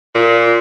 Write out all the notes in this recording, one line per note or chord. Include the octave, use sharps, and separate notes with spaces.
A#2